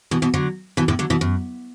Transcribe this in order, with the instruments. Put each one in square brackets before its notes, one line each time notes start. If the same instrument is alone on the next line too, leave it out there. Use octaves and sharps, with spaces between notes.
[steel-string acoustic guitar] B2 E3
B2 E3
D3 F#3
B2 E3
A2 D3
D3 F#3
B2 E3
F#2